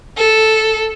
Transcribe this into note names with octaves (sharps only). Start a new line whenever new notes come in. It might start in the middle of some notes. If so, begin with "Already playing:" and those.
A4